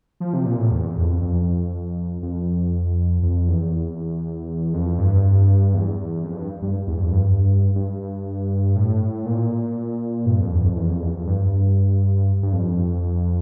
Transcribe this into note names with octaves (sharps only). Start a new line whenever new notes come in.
F3
C3
A#2
A2
E2
F2
F2
F2
F2
E2
F2
G2
E2
F2
G2
G2
E2
F2
G2
G2
A2
A#2
G2
F2
E2
F2
E2
F2
E2
F2
G2
G2
F2